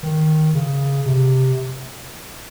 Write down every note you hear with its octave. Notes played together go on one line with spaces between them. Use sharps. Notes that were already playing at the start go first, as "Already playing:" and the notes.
D#3
C#3
C3